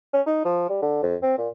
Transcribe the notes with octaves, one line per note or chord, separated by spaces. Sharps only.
C#4
D#4
F3
G3
D3
F2
C4
A#2